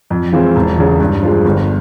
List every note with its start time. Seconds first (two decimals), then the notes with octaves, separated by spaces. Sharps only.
0.10 F2
0.32 E3 G#3 C4 F4
0.56 E1
0.78 E2 C#3
1.00 G2
1.23 F3 G#3
1.45 G1